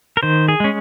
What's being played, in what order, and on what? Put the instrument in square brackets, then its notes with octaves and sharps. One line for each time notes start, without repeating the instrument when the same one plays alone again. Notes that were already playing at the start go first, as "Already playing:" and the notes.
[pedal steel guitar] A#4
D#3 C5
G#4
G#3 C#4